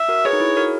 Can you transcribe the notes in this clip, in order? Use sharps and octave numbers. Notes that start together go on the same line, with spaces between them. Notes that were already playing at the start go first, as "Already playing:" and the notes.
Already playing: E5
F#4 A#4
G#4 B4 C#5
D#4
E4
G#4
F#4 A#4